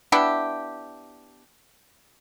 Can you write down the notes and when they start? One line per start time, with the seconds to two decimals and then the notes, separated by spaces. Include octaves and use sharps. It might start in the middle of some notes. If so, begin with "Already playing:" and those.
0.12 B3 D4 E4 G4